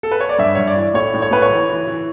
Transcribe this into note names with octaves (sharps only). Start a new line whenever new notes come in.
A4
B4
C#5
D5
G2 E5
G2 C#5
D5
E3
A2 C#5
A2
C#5
A2 B4
C#5
E3
E3
E3